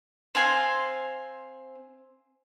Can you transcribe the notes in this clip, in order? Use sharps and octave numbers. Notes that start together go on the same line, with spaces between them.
C4 F5 G#5 C6